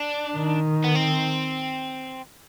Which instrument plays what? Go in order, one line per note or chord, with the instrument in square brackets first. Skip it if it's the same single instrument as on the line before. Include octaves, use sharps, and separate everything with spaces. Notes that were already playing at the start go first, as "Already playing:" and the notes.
Already playing: [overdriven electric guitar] D4
[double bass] D#3
[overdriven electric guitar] B3
C4